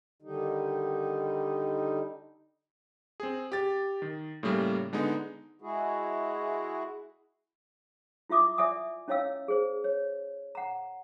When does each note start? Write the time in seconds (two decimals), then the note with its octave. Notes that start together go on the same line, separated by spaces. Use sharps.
0.22 D3 D#3 G3 D#4
3.20 C4 G#4
3.52 G4 A6
4.02 D#3
4.43 A2 C#3 G3 A#3
4.93 D3 G#3 B3 D#4
5.62 G#3 E4 F#4 G#4
8.30 E4 F4 E5 D6 D#6
8.58 D5 E5 G#5 D#6
9.08 C#4 E4 C#5 D#5 F5 E6
9.48 G#4 C5
9.84 C#5
10.55 F#5 A#5